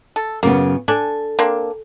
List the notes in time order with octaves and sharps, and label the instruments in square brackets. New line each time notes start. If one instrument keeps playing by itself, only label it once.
[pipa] A4
[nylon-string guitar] F#2 C#3 B3 [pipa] A#3
[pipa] D4 [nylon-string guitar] A4 G#5
[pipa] A#3 C4 D4